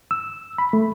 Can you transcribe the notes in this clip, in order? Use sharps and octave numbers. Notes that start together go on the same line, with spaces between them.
E6
B5
A3